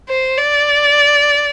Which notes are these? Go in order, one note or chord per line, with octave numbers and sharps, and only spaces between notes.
C5
D5